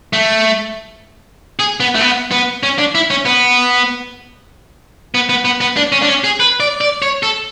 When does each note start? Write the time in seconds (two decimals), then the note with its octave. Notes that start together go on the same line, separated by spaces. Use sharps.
0.13 A3
1.59 G#4
1.80 B3
1.95 A3
2.01 B3
2.31 B3
2.63 C#4
2.79 D4
2.95 E4
3.10 C#4
3.25 B3
5.15 B3
5.29 B3
5.45 B3
5.61 B3
5.77 D4
5.92 C#4
6.02 D4
6.08 C#4
6.24 G#4
6.40 B4
6.60 D5
6.81 D5
7.02 C#5
7.23 A4